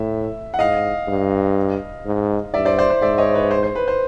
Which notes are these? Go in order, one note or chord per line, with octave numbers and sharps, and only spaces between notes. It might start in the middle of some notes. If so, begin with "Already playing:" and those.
Already playing: A2 E5
F#5
G#2 D#5 F5
G2
G#2
G2 D5 E5
C5 D5
C5 D5
C5
G#2 D5 E5
C#5 D#5
B4 C#5
C5
C5
B4
C5